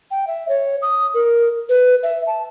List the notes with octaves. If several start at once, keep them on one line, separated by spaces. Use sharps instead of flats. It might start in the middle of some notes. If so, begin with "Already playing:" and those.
G5
E5
C#5
D#6
A#4
B4
E5
A5